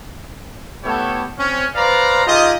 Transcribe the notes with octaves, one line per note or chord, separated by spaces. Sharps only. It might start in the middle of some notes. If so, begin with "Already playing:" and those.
A3 B3 E4 G4 A4 C#5
C4 C#4
B4 C5 D5 F5 A#5
D#4 F4 G4 G#4 D#5